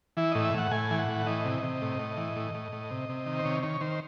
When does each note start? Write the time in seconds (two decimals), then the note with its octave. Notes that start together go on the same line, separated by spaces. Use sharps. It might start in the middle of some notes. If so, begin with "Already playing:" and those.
0.17 E3 E4
0.31 A2 D#5
0.45 E5
0.54 A2 F#5
0.71 A2 G#5
0.91 E3
0.99 F#5
1.08 A2
1.26 E3 D#5
1.45 C3
1.63 C3
1.82 A2
1.99 A2
2.17 E3
2.36 A2
2.54 A2
2.72 A2
2.90 C3
3.09 C3
3.26 D#3
3.39 C5
3.45 C3 C#5
3.62 D#3 C#5
3.81 D#3 C5